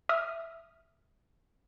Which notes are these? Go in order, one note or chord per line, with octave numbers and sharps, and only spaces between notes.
E5 D#6 F6